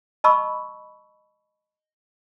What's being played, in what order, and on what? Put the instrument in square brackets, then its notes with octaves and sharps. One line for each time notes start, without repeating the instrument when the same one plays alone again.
[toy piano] D#5 A5 B5 C#6 E6